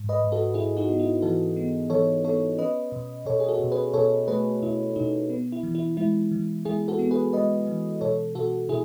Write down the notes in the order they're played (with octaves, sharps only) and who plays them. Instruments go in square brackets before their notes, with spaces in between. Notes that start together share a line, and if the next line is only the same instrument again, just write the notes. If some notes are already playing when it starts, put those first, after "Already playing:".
Already playing: [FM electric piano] G#2
B4 D#5
G#2
F#4 A4
G#2 E4 G#4
D#4 F#4
B3
E4
E3 F#4 A4
B3
E3 A4 C#5
B3 A4 C#5
C#4 B4 D#5
B2
B2 A4 C#5
G#4
F#4 A4
B2
G#4 B4
B2 A4 C#5
A3 G#4 B4
B2 E4
B2 D#4
B3
E4
E3
E4
G#3 E4
E3
G#3 E4 G#4
F#4 A4
B3
G#4 B4
G#3 B4 D#5
E3
B2 A4 C#5
B2 F#4 A4
B2 E4 G#4